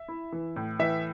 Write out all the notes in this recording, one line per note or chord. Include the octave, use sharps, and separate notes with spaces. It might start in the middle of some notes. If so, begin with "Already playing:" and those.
Already playing: E5
E4
E3
A2
E3 E5